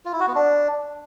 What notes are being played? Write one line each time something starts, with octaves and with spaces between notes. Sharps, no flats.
F4
E4
F#4
B3
D4